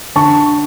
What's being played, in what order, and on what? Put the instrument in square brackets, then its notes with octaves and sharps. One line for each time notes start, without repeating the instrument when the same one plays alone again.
[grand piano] D3 A5 C#6